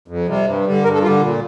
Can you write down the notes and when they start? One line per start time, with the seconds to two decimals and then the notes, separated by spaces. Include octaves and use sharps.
0.08 F2
0.27 C3 G3
0.46 G2
0.66 D3 G3
0.84 G2 A#4
0.94 A4
1.02 G3 F4
1.06 D3
1.21 A#2